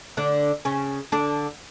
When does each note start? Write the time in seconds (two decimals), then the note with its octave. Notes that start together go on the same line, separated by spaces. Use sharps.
0.17 D3 D4
0.65 C#3 C#4
1.12 D3 D4